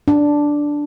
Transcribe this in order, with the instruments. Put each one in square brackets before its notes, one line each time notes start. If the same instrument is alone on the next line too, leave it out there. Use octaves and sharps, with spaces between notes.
[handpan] D4